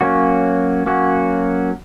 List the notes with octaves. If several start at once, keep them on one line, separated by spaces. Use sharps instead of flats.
F#3 A#3 C#4 F#4
F#3 A#3 C#4 F#4